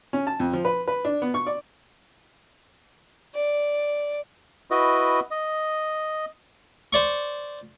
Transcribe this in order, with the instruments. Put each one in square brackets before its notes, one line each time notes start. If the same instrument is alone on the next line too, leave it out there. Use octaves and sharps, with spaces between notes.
[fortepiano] C#4
A5
F2
F3
B4
B4
D4
B3
C#6
D5
[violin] D5
[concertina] E4 F#4 B4 D#5
D#5
[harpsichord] C5 D5 C#6